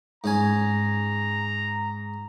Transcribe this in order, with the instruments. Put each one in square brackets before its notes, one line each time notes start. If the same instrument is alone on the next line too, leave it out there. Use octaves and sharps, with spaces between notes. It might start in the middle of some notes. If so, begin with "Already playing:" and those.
[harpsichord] G#2 C#4 G#5 [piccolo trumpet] A#5